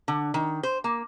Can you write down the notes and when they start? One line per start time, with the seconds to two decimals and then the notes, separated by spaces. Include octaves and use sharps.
0.08 D3
0.34 D#3
0.63 C5
0.84 A#3